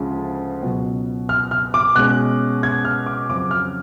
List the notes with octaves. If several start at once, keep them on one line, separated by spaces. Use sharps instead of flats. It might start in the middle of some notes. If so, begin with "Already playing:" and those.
Already playing: D2 C#3 F3 G#3 C#4
C#2 B2 F#3
F6
F6
D6
B2 G#3 C#4 F#6
G#6
F6
D6
F2 C#3 F#3 D6
F6